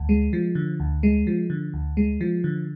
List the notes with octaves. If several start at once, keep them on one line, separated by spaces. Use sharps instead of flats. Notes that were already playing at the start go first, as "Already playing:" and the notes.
Already playing: D2
G#3
F3
D3
D2
G#3
F3
D3
D2
G#3
F3
D3